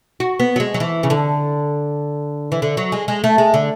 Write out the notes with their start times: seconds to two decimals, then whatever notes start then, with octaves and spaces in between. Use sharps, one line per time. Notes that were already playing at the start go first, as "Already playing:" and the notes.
0.20 F#4
0.40 B3
0.56 F#3
0.60 G#3
0.74 F#3
0.80 E3
1.03 C#3
1.10 D3
2.52 E3
2.62 D3
2.77 F#3
2.92 G#3
3.08 G#3
3.24 A3
3.38 G#3
3.54 D3